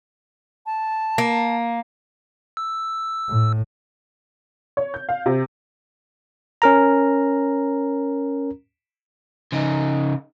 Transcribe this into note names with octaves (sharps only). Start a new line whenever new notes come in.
A5
A#3
E6
A2
C#5
G6
F5
C3
C#4 A#4 A#5
C#3 D#4